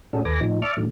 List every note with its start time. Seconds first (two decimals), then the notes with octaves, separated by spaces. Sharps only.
0.13 A2 C#4 D4 F#4 G#4 A4
0.25 D#2 A4 B4 G#5 D6 A#6
0.41 A2 F3 D#4
0.62 D5 E5 A5 C#6 D6 F6
0.77 A2 D3 D#3 F#3 A3